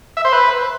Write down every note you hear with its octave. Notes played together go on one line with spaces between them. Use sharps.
E5
C5
B4